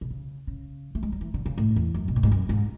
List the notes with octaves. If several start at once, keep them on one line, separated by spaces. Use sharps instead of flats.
B2
C#3
C#3
A3
G#3
F#3
E3
D3
C#3
A2
E2
F#2
B2
A2
G#2
F#2
G#2